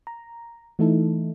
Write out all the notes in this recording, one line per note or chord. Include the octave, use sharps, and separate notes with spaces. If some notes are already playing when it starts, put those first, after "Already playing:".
A#5
E3 A3 D#4 E4 A4